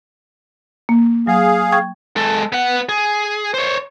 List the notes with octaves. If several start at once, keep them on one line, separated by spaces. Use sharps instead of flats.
A#3
F#3 G#4 F5
G5 C#6 G#6
G#3 A4
B3 F#5
G#4
C5 C#5